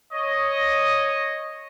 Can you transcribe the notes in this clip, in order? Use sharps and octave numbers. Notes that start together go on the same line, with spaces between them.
C#5 D#5